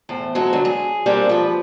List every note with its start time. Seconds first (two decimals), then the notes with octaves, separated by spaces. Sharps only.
0.09 E2 A2 C5
0.35 F#3 G#3 F#4 A4
0.53 G2 D3 F#3 F#4
0.65 G#4
1.06 G3 G#3 A#3 C4 D4 G4
1.29 F3 B4